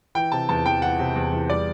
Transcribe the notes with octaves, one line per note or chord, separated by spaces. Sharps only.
E3 G5
C3 A5
E2 A5
E2 G5
E3 F#5
C3
E2
E2
G3 D5